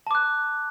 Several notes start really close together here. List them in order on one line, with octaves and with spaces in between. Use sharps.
A5 D6 F#6